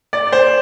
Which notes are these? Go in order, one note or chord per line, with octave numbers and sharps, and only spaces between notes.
D5
C5